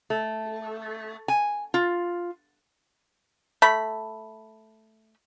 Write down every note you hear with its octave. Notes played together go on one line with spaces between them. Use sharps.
A3
G#5
F4
A3 B5